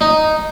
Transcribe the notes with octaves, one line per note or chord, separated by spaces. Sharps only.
D#4